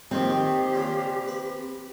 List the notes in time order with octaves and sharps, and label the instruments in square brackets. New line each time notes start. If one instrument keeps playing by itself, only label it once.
[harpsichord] A#2 D#3 F3 [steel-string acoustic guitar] C4 [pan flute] G4
[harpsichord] D#3
A#2 C#3
B4